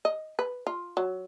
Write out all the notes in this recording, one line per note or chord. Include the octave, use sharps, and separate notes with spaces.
D#5
B4
F4
F#3